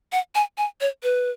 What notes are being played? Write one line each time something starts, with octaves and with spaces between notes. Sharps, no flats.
F#5
G#5
G#5
C#5
B4